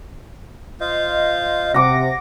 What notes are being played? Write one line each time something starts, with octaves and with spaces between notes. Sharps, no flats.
F4 C5 D#5 F5
C3 F#5 D6 A#6